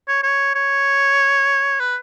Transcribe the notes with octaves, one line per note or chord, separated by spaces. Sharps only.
C#5
C#5
C#5
B4